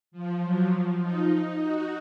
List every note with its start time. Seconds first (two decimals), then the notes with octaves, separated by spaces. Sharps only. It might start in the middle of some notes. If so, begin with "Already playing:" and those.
0.12 F3
0.41 F#3
0.71 F3
1.00 D#4
1.30 D#4
1.60 F#4